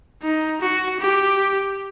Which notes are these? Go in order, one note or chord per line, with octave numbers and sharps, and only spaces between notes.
D#4
F#4
G4